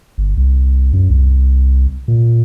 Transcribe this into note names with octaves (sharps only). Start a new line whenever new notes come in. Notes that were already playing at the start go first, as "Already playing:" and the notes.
G1
C2
F#2
C2
A#2